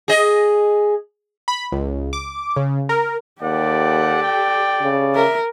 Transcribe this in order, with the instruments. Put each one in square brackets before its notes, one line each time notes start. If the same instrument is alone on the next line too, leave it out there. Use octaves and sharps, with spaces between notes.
[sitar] G#4 D#5
[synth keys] B5
C#2
D6
C#3
A#4
[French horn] D#2 [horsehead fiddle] G4 A4 [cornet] D5 [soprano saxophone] F#5
[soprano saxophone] G5
[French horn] C#3
[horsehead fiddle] A#4 [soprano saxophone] E5